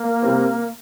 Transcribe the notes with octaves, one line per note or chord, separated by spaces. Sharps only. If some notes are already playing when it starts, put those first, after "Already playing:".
Already playing: A#3
C3 G3 C4